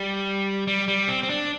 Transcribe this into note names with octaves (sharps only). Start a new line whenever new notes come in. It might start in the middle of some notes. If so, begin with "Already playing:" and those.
Already playing: G3
G3
G3
C4
C4
D4